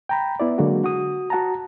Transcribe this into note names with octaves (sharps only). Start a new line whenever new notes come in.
G5 A#5 B5
B3 E4 D5
D3 F#3 G#3 A#3 F#4
F#4 D#6
F#4 F#5 A5 A#5